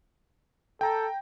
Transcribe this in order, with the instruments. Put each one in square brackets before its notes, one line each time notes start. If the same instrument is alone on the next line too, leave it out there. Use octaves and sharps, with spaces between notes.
[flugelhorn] A4 [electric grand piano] G5 A#5